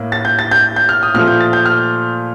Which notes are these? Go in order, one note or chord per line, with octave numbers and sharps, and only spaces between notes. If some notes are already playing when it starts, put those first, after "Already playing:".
Already playing: A2 A#3
A6
G6
A6
G6
G6
F6
D#6
A#2 F3 A3 F6
G6
A6
G6
F6